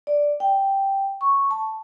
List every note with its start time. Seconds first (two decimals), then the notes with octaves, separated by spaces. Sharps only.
0.07 D5
0.40 G5
1.21 C#6
1.51 A5